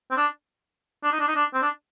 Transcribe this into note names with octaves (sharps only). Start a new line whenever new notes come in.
C4
D4
D4
D#4
D4
D#4
D4
C4
D4